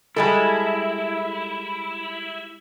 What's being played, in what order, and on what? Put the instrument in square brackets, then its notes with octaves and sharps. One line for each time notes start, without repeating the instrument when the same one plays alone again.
[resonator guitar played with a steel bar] G3 G#3 A4 [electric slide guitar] E4